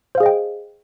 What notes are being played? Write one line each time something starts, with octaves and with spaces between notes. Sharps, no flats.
G#4 C5 D#5 F5 G5